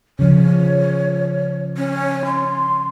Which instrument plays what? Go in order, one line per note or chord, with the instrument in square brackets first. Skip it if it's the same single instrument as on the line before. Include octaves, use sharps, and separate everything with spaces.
[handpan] C#3 F3 [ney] C#5
[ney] C#4
C6